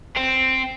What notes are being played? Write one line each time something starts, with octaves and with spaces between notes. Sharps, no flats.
C4